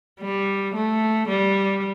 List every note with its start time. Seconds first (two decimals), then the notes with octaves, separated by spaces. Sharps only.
0.21 G3
0.74 A3
1.28 G3